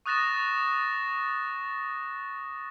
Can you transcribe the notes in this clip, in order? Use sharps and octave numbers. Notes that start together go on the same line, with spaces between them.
C#6 D#6 F#6 A6 A#6 E7